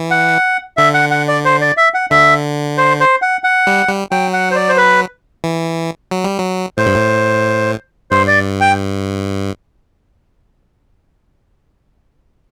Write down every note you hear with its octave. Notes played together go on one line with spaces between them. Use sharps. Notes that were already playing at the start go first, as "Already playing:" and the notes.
Already playing: E3
F#5
D3 E5
F#5
F#5
D5
C5
D5
E5
F#5
D3 E5
C5
C5
F#5
F#5
G3
G3
F#3 G5
F#5
C5
D5
C5
B4
E3
F#3
G3
F#3
A2 C5
G2
A2
G2 C5
D5
G5